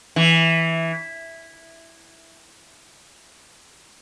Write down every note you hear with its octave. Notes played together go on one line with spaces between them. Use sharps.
E3